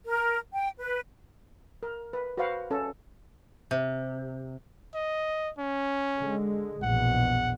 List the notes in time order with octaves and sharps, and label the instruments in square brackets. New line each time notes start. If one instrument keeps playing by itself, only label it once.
[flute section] A#4
G5
B4
[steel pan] A#4
B4
F#4 B4 C5 F5 F#5
C#4 A4
[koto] C3
[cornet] D#5
C#4
[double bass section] D3 G#3
[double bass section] A#1 E2 B2 [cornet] F#5